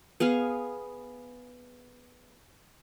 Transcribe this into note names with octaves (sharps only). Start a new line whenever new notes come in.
B3 G#4 F5 G#5